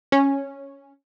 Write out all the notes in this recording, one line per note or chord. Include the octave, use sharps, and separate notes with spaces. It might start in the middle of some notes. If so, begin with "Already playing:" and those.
C#4